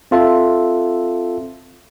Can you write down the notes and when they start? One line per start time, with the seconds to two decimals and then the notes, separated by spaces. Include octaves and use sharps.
0.11 C4 F4 A4 E5